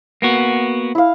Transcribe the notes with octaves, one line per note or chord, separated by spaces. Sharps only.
A#3 B3 F#4
E4 F5